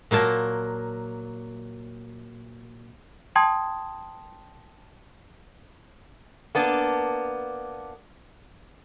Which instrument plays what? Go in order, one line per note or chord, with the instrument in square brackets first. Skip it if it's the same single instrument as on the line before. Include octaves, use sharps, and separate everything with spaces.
[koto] A#2 F#3 A#3 A5
[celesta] G5 A5 C6 D#6 G#6
[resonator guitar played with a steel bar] A#3 B3 D4